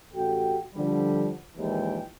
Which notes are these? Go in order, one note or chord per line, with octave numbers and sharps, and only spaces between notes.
A1 F#4 G4 A4 G5
D3 F3 G3
A#1 D#2 A#2 E3 G#3 G5